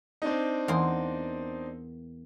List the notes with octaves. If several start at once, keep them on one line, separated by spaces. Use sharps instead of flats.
C4 D4 D#4
E2 A#3 C5